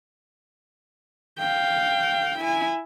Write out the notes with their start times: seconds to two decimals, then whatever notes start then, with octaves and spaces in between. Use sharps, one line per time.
1.39 F5 G5
2.39 E4 G#5